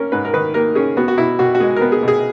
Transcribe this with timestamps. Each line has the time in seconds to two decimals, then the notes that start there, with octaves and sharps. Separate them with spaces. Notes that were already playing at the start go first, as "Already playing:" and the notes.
Already playing: A#3 C#4 A#4
0.12 G#2 B4
0.25 A#4
0.33 D#3 B4
0.54 A#3 A#4
0.75 C#4 G#4
0.97 B3 F#4
1.08 F#4
1.17 B2 E4
1.39 B2 F#4
1.55 F#4
1.60 G#3 G#4
1.76 B3 A#4
1.92 G#4
2.02 B2
2.08 G#4